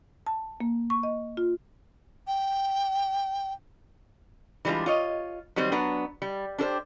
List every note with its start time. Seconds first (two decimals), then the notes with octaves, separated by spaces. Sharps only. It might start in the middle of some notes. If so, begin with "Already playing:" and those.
0.26 A5
0.60 A#3
0.90 C#6
1.03 D#5
1.37 F4
2.27 G5
4.65 E3 G3 G#3 D4 F4
4.86 F4 C#5 D#5
5.56 D#3 F#3 G3 C4
5.72 F#3 B3 D4
6.22 G3
6.58 D4 G4 A4 C5